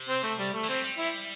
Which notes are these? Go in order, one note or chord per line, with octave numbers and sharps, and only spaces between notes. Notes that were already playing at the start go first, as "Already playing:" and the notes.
Already playing: C3
C4
A3
G3
A3
E3
G3 C4
G3
E4